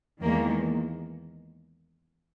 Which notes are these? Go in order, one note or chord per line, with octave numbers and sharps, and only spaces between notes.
E2 D#3 G#3 A#3